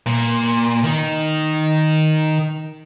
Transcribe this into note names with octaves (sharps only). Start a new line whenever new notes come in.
A#2
D#3